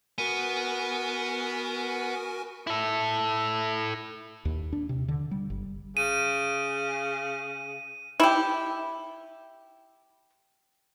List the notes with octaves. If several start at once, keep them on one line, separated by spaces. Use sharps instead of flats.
B3 F#4 A#4 G#5 D#7
E4 A4
D#2
D4
C3
D3
G3
G1
C#3 D#7
E4 G4